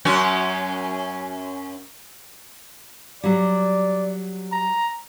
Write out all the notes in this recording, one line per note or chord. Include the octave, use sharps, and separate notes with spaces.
F#2 C#4 F#4
F#3 G3 D5
A#5